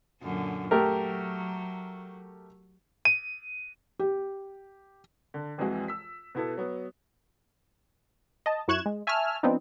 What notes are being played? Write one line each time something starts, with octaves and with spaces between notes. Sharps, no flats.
F#2 A#2 D3
F#3 A3 G4 A#4
D#7
G4
D3
A#1 F2 E3 G#3 F#4
E6 B6
B2 B3 E4 A4
F#3 B3
D#5 A5
F#2 E4 C#6 F#6 G#6 E7
G#3
E5 G#5 A5 C#6 E6 F6
F3 B3 C4 D4 D#4